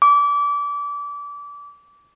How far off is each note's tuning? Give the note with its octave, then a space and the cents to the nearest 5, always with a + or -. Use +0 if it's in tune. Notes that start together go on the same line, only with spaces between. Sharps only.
D6 -25